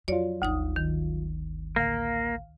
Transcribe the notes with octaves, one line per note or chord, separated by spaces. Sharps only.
F2 F#3 F4 C#5 D5
G1 D2 D#4 D#6
D#3
A1 D2 A#3 F5